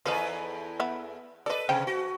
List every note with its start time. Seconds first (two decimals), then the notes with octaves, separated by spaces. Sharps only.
0.05 E2 F3 D#4 A4 B4
0.80 B3 E4
1.46 A4 B4 D5 D#5
1.69 C3 F3 C5 G5
1.87 F#4